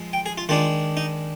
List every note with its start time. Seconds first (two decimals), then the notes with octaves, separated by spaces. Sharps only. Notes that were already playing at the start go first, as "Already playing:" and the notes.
Already playing: F3 G#3
0.13 G5
0.26 G#4
0.38 F4
0.49 D#3 G#3 D4 F4
0.97 D#4